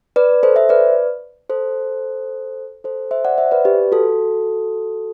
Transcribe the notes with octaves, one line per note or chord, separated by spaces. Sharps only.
B4 D5
A4 C5
C5 E5
B4 D5
A4 C5
A4 C5
C5 E5
D5 F#5
C5 E5
B4 D5
G4 B4
F#4 A4